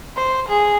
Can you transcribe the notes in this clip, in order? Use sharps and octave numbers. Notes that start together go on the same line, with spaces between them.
C5
G#4